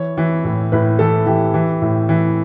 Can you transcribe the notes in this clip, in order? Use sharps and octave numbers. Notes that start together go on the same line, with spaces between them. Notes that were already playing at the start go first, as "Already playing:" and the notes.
Already playing: E3 C#5
E3
A2
A2 B4
E3 A4
E3 G4
E3
A2
E3